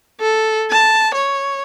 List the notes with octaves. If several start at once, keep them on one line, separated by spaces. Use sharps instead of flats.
A4
A5
C#5